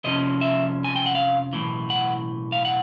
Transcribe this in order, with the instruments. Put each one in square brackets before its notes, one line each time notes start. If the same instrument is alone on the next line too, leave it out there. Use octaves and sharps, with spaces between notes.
[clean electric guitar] F2 C3 F3 C#4 D#5
E5
G#5
G5
F#5
F5
B1 A2 E3
F#5
F5
F#5